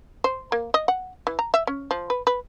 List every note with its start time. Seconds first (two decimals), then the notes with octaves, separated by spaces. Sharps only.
0.24 C5
0.52 A#3
0.74 D#5
0.88 F#5
1.27 E3
1.39 A#5
1.54 E5
1.67 C#4
1.91 F3
2.10 B4
2.27 B4